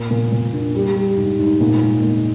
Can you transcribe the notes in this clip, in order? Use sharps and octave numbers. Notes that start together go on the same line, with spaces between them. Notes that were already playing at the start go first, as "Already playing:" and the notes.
Already playing: A#2
A#2
A#2
D4
G3
G3
G#2
G#2
A#2
G#3
A#2